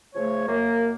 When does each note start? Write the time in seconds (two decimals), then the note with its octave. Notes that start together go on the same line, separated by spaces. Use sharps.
0.15 C#3 F3 A3 C#5
0.48 F#2 A#3